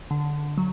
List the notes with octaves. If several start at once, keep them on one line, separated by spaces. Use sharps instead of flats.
D3
F#3